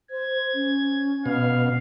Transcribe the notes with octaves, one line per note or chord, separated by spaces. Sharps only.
C5 G#6
C#4
B2 F5